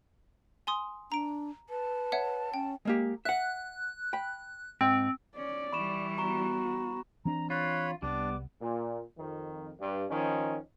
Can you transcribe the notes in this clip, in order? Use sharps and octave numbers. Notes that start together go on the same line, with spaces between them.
G#5 C6 D#6
D4 A#5 D7
B4 A5
C#5 E5 F#5
C#4 G5
G#3 A#3 G4
E5 F#5 F#6
G5 B5
G#2 C4
C#4 D5
E3 G3 B5 C#6 E7
B3 F#4 A#5 C#6
E3 C4 D4 A#5
F4 C#5 B5 F#6
C2 G3 B3 D4 D6
A#2
F2 D#3
G2
D#3 F3 C#4 D#4